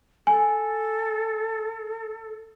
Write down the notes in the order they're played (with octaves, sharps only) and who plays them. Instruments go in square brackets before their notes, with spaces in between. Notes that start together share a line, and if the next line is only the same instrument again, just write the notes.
[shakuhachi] A4 [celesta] G#5